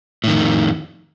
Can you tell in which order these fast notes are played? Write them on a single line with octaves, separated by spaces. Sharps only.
A2 D#3 F2